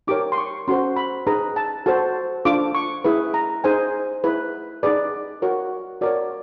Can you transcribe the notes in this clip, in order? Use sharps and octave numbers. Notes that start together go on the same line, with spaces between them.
D#4 G4 A#4 C#5 D6
C6
C#6
C#4 F#4 A4 C5 C6
B5
D#4 G#4 B4 A#5
A5
F#4 A4 C5 A5
D4 F4 A4 D6
C#6
E4 G#4 B4
A#5
D#4 G#4 C5 G#5
E4 G#4 B4
D#4 G#4 B4 D5
F#4 A#4 C#5
F#4 A#4 C#5 D5